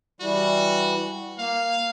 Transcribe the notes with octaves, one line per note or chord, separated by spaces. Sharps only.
E3 G3 F#4
A#3 F5